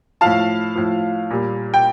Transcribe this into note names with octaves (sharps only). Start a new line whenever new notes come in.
A2 F3 F5 A5
A2 F3
A#2 G3
G5